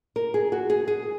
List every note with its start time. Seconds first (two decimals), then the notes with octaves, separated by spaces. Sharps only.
0.16 A#4
0.34 G#4
0.52 F#4
0.70 G#4
0.88 G#4